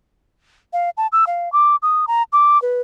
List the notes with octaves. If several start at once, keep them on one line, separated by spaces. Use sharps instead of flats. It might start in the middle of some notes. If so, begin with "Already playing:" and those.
F5
A5
E6
F5
D6
D#6
A#5
D6
B4